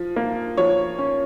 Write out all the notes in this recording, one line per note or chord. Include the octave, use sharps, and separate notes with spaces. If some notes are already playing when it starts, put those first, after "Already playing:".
Already playing: F3
A#3
F3 C#5
C#4